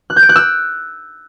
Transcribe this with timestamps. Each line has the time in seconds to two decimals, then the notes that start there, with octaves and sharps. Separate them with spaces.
0.10 F#6
0.16 G6
0.23 D7
0.29 F#6
0.36 E6